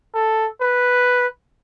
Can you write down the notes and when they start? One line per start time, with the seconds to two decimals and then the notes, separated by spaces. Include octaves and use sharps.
0.14 A4
0.61 B4